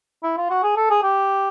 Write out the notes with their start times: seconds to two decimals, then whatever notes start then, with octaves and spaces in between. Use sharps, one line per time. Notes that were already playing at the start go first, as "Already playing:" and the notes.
0.23 E4
0.37 F4
0.50 F#4
0.63 G#4
0.77 A4
0.90 G#4
1.03 G4